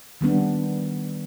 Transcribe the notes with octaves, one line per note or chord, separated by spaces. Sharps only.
D#3 G3 B3 D4